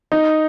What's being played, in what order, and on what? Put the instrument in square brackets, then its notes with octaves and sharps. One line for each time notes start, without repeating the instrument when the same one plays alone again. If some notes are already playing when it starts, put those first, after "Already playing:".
[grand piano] D#4